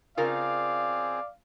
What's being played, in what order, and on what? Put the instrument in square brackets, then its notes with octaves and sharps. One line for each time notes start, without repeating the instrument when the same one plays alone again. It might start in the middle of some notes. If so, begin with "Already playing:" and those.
[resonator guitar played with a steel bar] C#3 F4 A#4 [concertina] C4 G#4 [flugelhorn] D5 [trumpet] F5